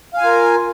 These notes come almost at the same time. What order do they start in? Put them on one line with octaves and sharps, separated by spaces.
F5 G#5 F4 A#4